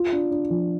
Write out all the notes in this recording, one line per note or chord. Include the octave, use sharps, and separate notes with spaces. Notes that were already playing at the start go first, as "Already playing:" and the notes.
Already playing: F4
D4
D4
F3